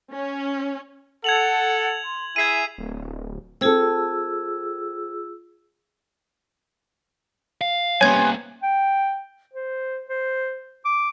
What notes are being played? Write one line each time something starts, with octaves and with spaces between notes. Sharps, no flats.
C#4
A4 F#5 G#6 F7 F#7
C6
E4 G#4 E5 G#5 G#6 C7 D#7
D1
C4 F4 G#4 A4 E6
F5
C3 G3 A#3 B3 C#4 C#5 G#5 G#6
G5
C5
C5
D6